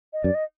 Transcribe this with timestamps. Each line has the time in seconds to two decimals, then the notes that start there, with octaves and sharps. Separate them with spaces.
0.13 D#5
0.24 F#2 D5
0.35 D#5